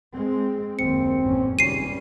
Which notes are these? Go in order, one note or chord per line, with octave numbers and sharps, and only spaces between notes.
G#3 C4
F#1 D#2 C4 C#7
A1 E2 C#4
G#1 C#2 G3 C#4 C7 D#7